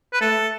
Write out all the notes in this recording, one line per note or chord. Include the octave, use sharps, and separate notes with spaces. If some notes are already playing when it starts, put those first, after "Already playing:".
B4
A3 A4